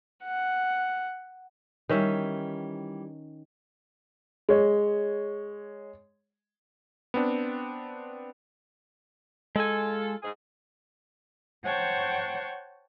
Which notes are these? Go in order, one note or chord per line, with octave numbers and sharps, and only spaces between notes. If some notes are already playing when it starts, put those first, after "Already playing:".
F#5
D#3 E3 G3 C#4 E5
G#3 C#5
B3 C4 D4
G#3 F4 A4 G#5
G#2 G#4
C5 C#5 F#5 G5 A5 C#6